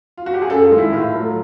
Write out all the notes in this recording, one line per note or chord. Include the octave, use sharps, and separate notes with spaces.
F4
F#4
G4
G#4
F#2 A4
F4
D#3 G#3
E4
A2 F4
F#3 A3